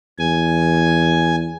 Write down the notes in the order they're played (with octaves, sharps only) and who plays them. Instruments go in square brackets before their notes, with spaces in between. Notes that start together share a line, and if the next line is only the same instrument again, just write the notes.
[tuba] E2 [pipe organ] G#5